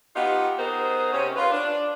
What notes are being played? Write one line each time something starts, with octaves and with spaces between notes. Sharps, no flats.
B3 D#4 F4 G4
B3 D#4 G#4 A#4 C5
C3 C#4
F4 B4
D4